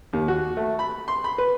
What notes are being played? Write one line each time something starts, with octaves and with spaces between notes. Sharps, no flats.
D#2
F#4
A3
B5
C6
B5
B4